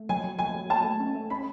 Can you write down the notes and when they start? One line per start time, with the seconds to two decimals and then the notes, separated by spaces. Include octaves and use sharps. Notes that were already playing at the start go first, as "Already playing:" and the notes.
Already playing: A3
0.09 F#3 G#5
0.24 F#3
0.39 F#3 G#5
0.55 F#3
0.70 F#3 A5
0.84 A3
1.00 C#4
1.15 A3
1.30 C#4 B5